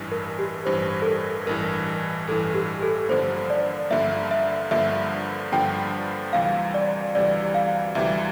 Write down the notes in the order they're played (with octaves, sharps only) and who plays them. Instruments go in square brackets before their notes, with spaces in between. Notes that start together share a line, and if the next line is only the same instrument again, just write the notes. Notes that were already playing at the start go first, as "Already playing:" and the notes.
Already playing: [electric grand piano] A1 G2 E3
[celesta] A#4
G4
[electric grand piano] A1 G2 E3 [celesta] C5
[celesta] A4
A#4
[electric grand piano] A1 G2 E3 [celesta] A#4
[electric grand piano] A1 G2 E3 [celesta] A4
[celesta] G4
A4
[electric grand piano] G2 D3 F3 A#3 [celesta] C5
[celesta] D5
[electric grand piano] G2 D3 F3 A#3 [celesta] E5
[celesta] E5
[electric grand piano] G2 D3 F3 A#3 [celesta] E5
[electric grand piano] G2 D3 F3 A#3 [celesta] G5
[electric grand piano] D2 C3 E3 G3 [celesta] F5
[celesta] D5
[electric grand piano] D2 C3 E3 G3 [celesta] D5
[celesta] F5
[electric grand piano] D2 C3 E3 G3 [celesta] E5